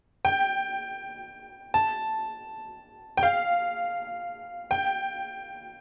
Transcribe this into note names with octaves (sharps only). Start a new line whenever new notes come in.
G5
A5
G5
F5
G5